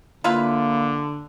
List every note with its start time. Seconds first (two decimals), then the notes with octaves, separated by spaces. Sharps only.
0.24 D3 A#3 E4 F4 B4